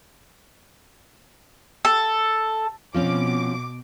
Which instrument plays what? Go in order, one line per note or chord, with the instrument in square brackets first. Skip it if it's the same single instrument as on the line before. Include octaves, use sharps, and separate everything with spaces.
[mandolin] A4
[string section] B2 D6 [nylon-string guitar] F3 C4 C#4